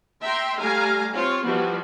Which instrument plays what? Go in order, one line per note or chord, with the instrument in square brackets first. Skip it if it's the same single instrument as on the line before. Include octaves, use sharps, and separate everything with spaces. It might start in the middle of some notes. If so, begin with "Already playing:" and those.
[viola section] E5 G5 A#5 C6
G3 A3 F5 G#5 A#5
C4 F4 C#5
E3 F3 G3 B3 F#4